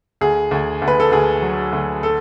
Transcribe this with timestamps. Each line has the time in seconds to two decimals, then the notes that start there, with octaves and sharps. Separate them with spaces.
0.21 D2 G#4
0.51 D2
0.82 D2
0.88 B4
1.00 A4
1.12 D2 G#4
1.42 F#3
1.73 D2
2.03 A4